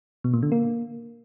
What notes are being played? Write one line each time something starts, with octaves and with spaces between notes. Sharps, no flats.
B2
A#2
D3
A#3